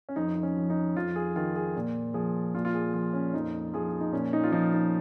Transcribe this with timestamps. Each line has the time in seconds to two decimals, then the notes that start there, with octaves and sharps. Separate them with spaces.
0.09 C#4
0.16 F2 D#4
0.35 D#4
0.43 C#4
0.56 F3
0.70 D#4
0.96 F2 F4
1.16 G#4
1.36 D#3 F4
1.56 G#4
1.76 A#2
2.14 F3 G#4
2.54 A#2 F4
2.65 F4
2.74 G#4
2.94 F3 F4
3.13 C#4
3.33 F2 D#4
3.74 F3 G#4
3.88 F4
4.01 D#4
4.12 A#2 C#4
4.33 D#4
4.44 F4
4.52 F3 D#4
4.73 D#4